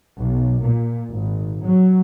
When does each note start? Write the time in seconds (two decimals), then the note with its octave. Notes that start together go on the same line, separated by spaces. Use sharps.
0.17 B1
0.61 A#2
1.10 G#1
1.65 F#3